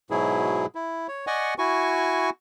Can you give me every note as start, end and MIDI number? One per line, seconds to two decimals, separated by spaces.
0.10 0.66 44
0.10 0.66 47
0.10 0.66 54
0.10 0.66 64
0.10 0.66 68
0.75 1.07 64
1.08 1.26 73
1.27 1.54 74
1.27 1.54 75
1.27 1.54 78
1.27 1.54 80
1.27 1.54 85
1.58 2.30 64
1.58 2.30 66
1.58 2.30 80
1.58 2.30 85